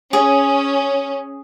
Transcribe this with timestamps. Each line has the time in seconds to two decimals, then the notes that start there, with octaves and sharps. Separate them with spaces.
0.13 C#4 G#4